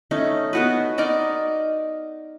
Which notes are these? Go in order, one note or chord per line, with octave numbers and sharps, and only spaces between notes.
A3 C#4 D#4
B3 F#4 B4
D#4 A#4 D5 D#5